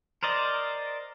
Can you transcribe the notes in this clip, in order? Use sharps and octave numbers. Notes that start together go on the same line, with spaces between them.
A#4 C5 D5 D#5